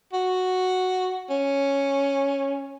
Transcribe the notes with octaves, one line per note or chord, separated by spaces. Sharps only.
F#4
C#4